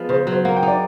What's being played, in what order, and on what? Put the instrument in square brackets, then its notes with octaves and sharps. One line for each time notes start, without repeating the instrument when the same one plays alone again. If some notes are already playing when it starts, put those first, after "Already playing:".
Already playing: [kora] F3 G#3 B3
[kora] C#3 [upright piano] C5
[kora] F#3
[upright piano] C5
[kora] A#3 [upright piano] F#5
[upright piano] G5
[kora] D#4
[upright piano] D5